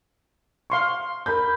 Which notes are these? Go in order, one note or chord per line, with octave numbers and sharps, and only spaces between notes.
F5 C6 C#6
A#4 B5 G6